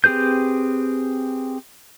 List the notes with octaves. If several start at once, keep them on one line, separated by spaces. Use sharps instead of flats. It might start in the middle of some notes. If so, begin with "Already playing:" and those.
C4 G4 G#4 B4 G6